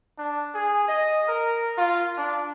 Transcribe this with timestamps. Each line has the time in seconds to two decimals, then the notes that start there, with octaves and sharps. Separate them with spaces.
0.18 D4
0.55 G#4
0.88 D#5
1.28 A#4
1.78 F4
2.18 D4